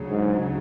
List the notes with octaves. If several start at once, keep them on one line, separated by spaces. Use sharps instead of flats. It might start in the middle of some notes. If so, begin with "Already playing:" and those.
Already playing: D2 C#3 F#3
G#2